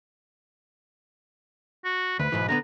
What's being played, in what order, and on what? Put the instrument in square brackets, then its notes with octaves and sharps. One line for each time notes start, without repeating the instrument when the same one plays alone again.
[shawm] F#4
[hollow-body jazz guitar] D2 [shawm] B4
[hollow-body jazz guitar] B1 G#2 E3
[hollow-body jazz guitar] D3 A3 B3 [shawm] A#5